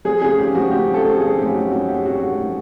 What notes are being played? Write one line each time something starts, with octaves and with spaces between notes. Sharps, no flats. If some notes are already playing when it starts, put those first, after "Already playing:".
F3 G#4
C#3 G#4
G#1 G4
F3 F#4
C#3 G4
F3 A4
F3
G#4
G#1
F#2 G4
G#1 F#4
F#2 F#4
F#2 G4
G#1 F#4
G#1
F3